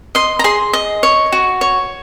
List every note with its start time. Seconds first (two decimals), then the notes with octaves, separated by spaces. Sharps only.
0.15 D#5 C6
0.39 A#5
0.44 G#4 C6
0.73 D#5
1.03 C#5
1.32 F#4
1.61 C#5